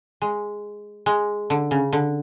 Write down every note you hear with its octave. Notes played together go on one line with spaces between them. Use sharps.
G#3
G#3
D3
C#3
D3